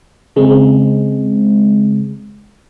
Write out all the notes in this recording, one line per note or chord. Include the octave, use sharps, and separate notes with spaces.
C#3 G#3 C4